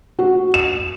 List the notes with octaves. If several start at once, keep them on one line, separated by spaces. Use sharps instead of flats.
F#4
E7